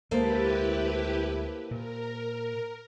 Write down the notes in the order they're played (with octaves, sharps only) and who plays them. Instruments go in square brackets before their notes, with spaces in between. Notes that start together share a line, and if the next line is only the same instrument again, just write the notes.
[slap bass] D2 G#3 [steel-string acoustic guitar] A#3 A4 C5 [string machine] E4 G4 B4
[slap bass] A#2 [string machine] A#4